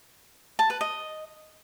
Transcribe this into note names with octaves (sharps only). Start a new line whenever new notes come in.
A5
B4
D#5